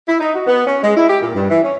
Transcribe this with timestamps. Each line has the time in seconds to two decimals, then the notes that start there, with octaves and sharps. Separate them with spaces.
0.08 E4
0.20 D#4
0.35 F#4
0.47 B3
0.66 C#4
0.83 G#3
0.97 E4
1.09 G4
1.22 A#2
1.35 G2
1.50 E3
1.64 C#4